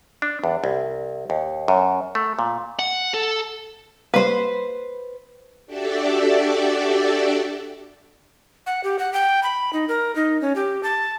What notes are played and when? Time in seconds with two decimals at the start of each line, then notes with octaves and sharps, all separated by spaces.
0.22 D4
0.44 E2
0.64 C2
1.30 D#2
1.68 F#2
2.15 A3
2.39 A#2
2.79 F#5
3.14 A4
4.14 G3 A#3 B4 C5
5.67 D4 F#4 G4 A4 D5 E5
8.66 F#5
8.84 G4
8.99 F#5
9.13 G5
9.43 B5
9.73 D#4
9.88 A#4
10.16 D#4
10.41 C#4
10.56 G4
10.83 A5